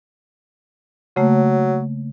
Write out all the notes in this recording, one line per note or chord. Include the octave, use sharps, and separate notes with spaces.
C#3 F#3 A3 A#3